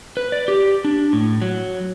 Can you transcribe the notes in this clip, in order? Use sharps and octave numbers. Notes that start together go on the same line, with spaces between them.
B4
D5
G4
D4
A2
F#3